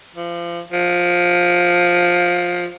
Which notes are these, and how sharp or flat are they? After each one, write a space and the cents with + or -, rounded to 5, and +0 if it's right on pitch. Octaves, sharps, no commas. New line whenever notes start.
F3 -30
F3 +15